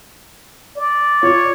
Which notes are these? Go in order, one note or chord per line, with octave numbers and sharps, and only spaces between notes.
D5
F4 C#5